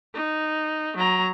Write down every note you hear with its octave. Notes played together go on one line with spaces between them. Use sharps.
D#4
F#3 A#5